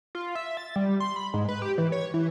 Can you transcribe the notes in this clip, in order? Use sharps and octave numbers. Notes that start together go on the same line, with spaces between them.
F4
E5
A6
G3
C6
B5
G#2
B4
G4
E3
C#5
E3